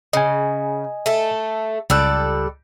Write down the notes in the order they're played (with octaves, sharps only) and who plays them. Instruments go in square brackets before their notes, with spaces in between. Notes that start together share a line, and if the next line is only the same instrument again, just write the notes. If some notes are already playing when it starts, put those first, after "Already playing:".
[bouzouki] C#3 [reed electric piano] D#5 G#5
[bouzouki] A3 A4
[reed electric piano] C#2 E6 F#6 [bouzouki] G3 A4 D5